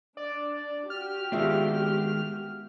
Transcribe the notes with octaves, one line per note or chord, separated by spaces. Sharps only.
D4 D5
F#4 G4 F6
D#3 G#3 B3 D4 F4 E5